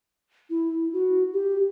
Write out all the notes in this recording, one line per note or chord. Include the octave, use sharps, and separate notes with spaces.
E4
F#4
G4